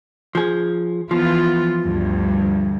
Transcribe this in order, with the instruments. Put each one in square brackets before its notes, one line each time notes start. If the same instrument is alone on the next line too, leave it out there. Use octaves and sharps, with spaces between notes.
[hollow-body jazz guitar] F3 G#4
[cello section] E3 B3 F4 [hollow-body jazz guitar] F3
[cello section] D2 G2